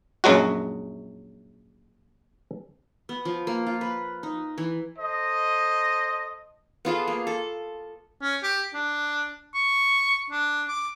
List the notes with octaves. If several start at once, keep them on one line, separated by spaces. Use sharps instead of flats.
A#1 F#2 F#3 G#3 F#4
B3
F3
A#3
F4
B4
D#4
E3
A4 C5 D#5
B3 F4 G#4 A4
A#3
A4
C#4
G4
D4
C#6
D4
D6